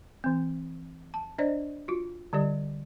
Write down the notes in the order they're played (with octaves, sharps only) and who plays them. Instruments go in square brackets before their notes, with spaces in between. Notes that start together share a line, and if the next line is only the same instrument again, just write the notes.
[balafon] E3 C4
A5
D4 C5 D5 D#5
F4 F#4
D3 G3 G4 D5